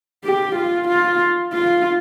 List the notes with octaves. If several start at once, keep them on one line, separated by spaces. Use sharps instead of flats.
G4
F4
F4
F4